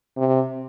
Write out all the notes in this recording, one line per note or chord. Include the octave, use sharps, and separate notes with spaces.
C3